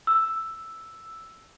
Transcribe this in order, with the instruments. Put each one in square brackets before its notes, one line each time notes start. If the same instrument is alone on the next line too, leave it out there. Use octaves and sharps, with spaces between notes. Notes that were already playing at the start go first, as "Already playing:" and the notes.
[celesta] E6